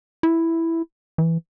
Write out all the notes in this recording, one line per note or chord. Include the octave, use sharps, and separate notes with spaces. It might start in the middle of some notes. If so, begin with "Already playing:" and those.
E4
E3